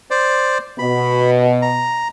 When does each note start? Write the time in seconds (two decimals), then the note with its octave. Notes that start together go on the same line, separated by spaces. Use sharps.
0.10 C5 D5
0.79 B2 B5
1.62 A#5